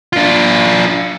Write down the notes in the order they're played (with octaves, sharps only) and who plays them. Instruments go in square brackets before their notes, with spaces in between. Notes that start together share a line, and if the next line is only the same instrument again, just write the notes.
[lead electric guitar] D4 F4